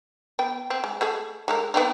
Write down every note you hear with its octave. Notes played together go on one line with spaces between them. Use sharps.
B3 G5
C4
G#3
A3 G#4 A4
G#3 A4 A#4
B3 C4 D#4